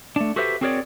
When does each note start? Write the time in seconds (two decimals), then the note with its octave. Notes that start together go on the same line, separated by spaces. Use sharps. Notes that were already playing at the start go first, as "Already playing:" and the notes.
0.16 A3 D4
0.36 F#4 G4 A4 B4 C5 E5
0.61 C4 F#4 G#4 A#4 C#5 D5